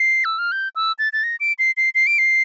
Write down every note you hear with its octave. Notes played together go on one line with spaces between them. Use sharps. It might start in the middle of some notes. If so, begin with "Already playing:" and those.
Already playing: C7
E6
F6
G6
E6
A6
A6
A#6
D7
C7
C7
C7
D7
C7